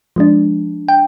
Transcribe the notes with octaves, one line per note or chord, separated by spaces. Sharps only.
F3 G#3 D4
G5